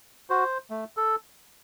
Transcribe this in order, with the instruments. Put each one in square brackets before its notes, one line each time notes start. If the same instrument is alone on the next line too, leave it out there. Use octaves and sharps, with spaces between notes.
[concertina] F#4 C5
A3
A4